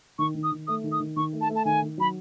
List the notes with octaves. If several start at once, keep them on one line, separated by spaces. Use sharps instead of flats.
D#3 C#6
D#3
D#6
D#3
A3 D#6
D#3
D#6
D#3
D#3 C#6
A3
A5
A3
A5
D#3 G#5
D#3
F#3 B5